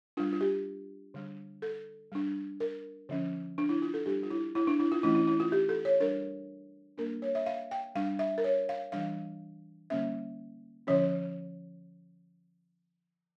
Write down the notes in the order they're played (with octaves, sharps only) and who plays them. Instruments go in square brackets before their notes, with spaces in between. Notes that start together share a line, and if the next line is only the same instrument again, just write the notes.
[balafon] G3 D4 F4
F4
G4
D3 G3 D4
A4
G3 D4
A#4
D3 F3 C#4
D4
E4
F4
A4
G3 D4 G4
F4
E4
E4
D4
E4
F4
E3 A3 C#4 E4
E4
E4
F4
G4
A4
C#5
G3 D4 A#4
G3 A#3 D4 A#4
C#5
E5
F5
G5
G3 D4 F5
E5
A#4
C#5
F5
E3 G3 D4 F5
D3 G3 A#3 C#4 E5
D3 F3 C#4 C#5